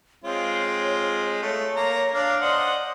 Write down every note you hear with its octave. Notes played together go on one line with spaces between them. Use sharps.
G#3 C4 F4 C#5
A3 C#5
A#3 A#5
D4 F5
C5 D5 D#5 F#5